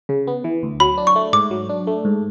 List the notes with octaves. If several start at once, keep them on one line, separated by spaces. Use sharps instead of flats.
C#3
B3
E3
D2
F#3 B5
D4
C#6
A3
G#2 D6
F#3
D4
A3
G#2